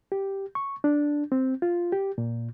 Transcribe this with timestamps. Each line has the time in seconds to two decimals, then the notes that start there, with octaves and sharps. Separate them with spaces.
0.12 G4
0.55 C#6
0.84 D4
1.32 C4
1.62 F4
1.92 G4
2.18 A#2